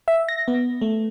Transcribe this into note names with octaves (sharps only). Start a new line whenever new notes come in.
E5
A#6
B3
A3